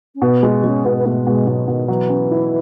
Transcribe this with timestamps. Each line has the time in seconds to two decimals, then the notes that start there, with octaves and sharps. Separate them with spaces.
0.15 C#4
0.22 B2 B3
0.43 G#3
0.64 G#3 C#4
0.85 B2 B3
0.97 B3
1.05 B2 A3
1.22 A3
1.26 B2 G#3
1.47 B2 F#3
1.68 B2 D#3
1.88 E3 F#3
2.09 C#4
2.31 E4